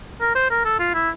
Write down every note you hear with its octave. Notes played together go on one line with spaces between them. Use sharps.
A#4
C5
A#4
A4
F4
E4